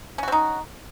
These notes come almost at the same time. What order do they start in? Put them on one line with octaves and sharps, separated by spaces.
C#4 F#4 C4 D#4